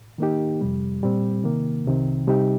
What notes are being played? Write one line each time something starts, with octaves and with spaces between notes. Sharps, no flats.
D#3 A#3 D#4 G4
F2 C3 G3
A#2 G3 C4
C3 D#3 A#3
C2 C3 D#3 C4
C3 G3 D#4 G4